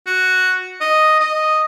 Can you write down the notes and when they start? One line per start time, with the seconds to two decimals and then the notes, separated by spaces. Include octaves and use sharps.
0.06 F#4
0.81 D#5
1.20 D#5